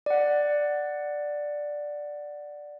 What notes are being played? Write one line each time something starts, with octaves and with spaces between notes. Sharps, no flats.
D5 F#5